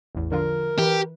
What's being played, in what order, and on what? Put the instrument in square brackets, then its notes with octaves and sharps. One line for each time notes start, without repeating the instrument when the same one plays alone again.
[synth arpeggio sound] A1 E2
[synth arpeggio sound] D3 F3 F4 [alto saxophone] A#4
[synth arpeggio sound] E3 B4 [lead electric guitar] G4